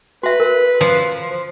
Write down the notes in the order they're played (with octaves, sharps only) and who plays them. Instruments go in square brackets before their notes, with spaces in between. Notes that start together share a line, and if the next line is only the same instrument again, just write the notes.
[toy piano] F#4 E5 [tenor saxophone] B4
[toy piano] A#4
[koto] F3